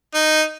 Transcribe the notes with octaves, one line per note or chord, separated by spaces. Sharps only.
D#4